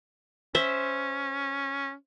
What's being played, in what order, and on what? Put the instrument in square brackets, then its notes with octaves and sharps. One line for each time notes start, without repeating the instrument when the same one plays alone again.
[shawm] C#4 [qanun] C5 E5